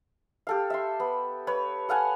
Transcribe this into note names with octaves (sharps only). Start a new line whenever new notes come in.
G4 A4 F5
E5 C6
B3
B4 C#5
A4 F5 F#5 G#5